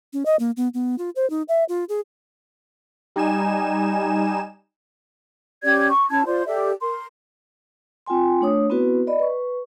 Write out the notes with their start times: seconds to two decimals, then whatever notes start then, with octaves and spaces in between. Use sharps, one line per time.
0.13 C#4
0.26 D#5
0.39 A#3
0.57 B3
0.74 B3
0.98 F4
1.16 C5
1.30 D#4
1.49 E5
1.69 F4
1.89 G#4
3.16 G3 D#4 G#5 E7
5.63 C#4 G4 D5 G#6
5.90 C#6
6.10 C#4 E4 A5 G#6
6.26 F4 C5 D5 C6
6.46 G4 A4 D5 E5
6.80 A#4 C6
8.06 C4 F4 G5 G#5 C6
8.41 A3 D4 C#5 D#6
8.70 B3 C4 E4 F#4 B4
9.07 D5 D#5 B5
9.20 B4 C#6